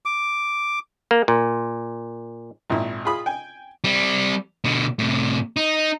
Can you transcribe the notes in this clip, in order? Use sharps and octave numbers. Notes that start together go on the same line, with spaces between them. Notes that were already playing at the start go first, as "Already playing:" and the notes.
D6
A#3
A#2
G#1 A#2 E4
F4 G#4 B5 D#6
G5 G#5
G3 C4
B2 D3
A2 C3
D#4